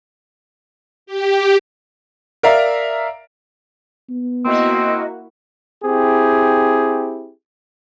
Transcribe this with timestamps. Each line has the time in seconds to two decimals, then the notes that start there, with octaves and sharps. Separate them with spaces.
1.06 G4
2.43 A#4 D5 E5 F5 A#5
4.10 B3
4.45 A#3 C4 E4 F#4 D#5
5.84 C4 E4 G4 G#4